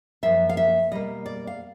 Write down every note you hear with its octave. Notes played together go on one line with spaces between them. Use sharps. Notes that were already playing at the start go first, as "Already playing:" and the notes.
F#2 C#3 F3 A#3 E5
F5
E5
B2 G3 A#3 D#5
D5
F5